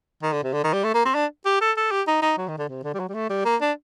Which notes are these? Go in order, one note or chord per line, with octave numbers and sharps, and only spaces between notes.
D#3
D3
C3
D3
D#3
G3
A3
A#3
C4
D4
G4
A4
A4
G4
D#4
D#4
F#3
D#3
D3
C3
D3
G3
F#3
G3
A3
G3
A#3
D4